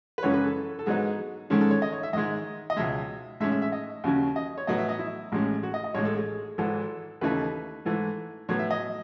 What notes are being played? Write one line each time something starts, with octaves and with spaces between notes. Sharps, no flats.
B4
F#2 C#3 E3 G#3 C#4 C#5
B4
A4
A4
G#2 F#3 B3 D#4 G#4
G#2 D#3 G#3 C#4 A4
A4
C#5
D#5
C#5
E5
G#2 D#3 G#3 D#5
D#5
C#2 B2 G#3 E5
A2 G#3 C#4 E5
E5
E5
D#5
D#2 C#3 F#3 C#4
D#5
C#5
A2 F#3 B3 D#5
E5
D#5
E4
A1 A2 G#3 C#4
F#4
D#5
D#5
A1 A2 G#3 C#5
A4
G#4
G#1 G#2 E3 A4
D#2 C#3 E3 A3 D#4 B4
G#2 E3 A3
A2 F#3 B3 C#5
E5
D#5